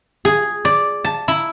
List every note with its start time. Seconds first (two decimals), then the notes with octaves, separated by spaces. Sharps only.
0.25 G#4
0.65 D5
1.04 A5
1.28 E4